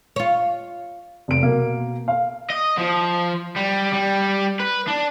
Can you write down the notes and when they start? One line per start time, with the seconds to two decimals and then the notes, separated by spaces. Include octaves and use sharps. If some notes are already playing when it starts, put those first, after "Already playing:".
0.16 F4 C#5
1.28 F1 D7
1.43 B2 A#3
2.08 F5
2.50 D#5
2.78 F3
3.56 G3
3.93 G3
4.60 B4
4.88 D4